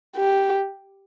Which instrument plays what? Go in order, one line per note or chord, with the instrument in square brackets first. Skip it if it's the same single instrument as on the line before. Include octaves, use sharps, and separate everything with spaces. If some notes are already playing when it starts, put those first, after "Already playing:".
[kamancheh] G4